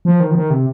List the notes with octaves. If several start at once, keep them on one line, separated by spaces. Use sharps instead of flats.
F3
D#3
F3
D#3
C3